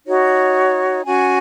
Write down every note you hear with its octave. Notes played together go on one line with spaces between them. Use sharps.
D#4 F#4 C#5
C#4 F#4 C#5 G#5